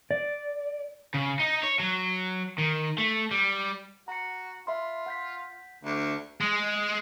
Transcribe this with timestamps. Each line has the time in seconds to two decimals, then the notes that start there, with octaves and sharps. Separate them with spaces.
0.11 D5
1.14 C#3
1.40 D#4
1.63 C#5
1.80 F#3
2.58 D#3
2.98 A3
3.31 G3
4.08 F#4 A#5 C#7
4.67 F4 E5 B5 C6
5.06 F#5 G6 B6
5.84 D2
6.41 G#3